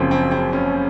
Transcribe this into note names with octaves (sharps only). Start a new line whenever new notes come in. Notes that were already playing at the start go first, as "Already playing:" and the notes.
Already playing: F#1 F#2 F3 C4
C4
C4
C#4